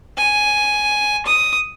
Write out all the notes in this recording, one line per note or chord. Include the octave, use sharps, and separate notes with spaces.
G#5
D#6